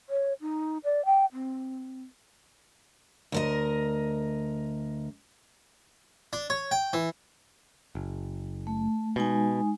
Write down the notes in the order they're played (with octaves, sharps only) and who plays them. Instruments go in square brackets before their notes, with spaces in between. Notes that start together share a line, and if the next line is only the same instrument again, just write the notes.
[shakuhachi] C#5
D#4
D5
G5
C4
[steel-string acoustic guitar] D2 A#4 D#5
[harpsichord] D4
C#5
G5
E3
[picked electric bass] F#1
[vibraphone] A3
[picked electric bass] B2 [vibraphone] G#3 D#4 G#5